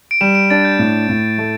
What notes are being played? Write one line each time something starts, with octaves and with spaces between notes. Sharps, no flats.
D7
G3 E7
D7
D4 A6
G6
A2
A2
A3